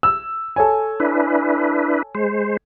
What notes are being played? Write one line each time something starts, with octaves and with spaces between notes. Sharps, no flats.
E6
A4 C#5 G#5
D4 E4 B4
G#3 C5